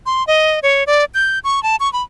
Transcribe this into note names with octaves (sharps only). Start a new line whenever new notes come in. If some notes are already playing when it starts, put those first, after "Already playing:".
C6
D#5
C#5
D5
G6
C#6
A5
C#6
B5